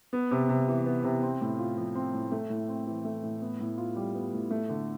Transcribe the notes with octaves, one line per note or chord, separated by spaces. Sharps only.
B3
C3
C3
E3
B3
C3
C4
A2
F4
F3
C4
A2
A3
A2
C4
E3
A3
A2
B3
A2
F4
G3
B3
A2
A3
D3